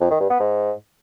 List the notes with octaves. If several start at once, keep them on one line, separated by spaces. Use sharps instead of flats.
F2
D#3
G2
B3
G#2